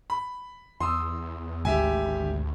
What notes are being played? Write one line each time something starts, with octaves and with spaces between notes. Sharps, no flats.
B5
E2 C6 D#6 E6
G#1 D2 G4 E5 G#5